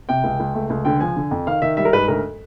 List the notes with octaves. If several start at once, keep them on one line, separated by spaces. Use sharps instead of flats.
C3 G5
C#2
C#2
A3
C#2
D3 G5
F3 G#5
D3
F2
D#3 F5
D#3 E5
G3 E5
A#4
G#2 B4
D2 A#4